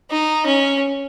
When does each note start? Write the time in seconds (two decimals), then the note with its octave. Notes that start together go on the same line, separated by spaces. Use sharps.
0.11 D#4
0.46 C#4